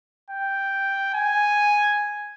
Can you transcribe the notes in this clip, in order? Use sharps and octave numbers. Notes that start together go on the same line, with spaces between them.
G5
G#5